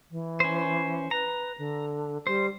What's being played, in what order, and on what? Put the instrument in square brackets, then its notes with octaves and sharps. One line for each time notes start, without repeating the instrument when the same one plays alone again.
[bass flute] E3
[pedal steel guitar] C#4 C5
[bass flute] B4 [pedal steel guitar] A#5
[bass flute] D3
[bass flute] G3 [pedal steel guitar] C5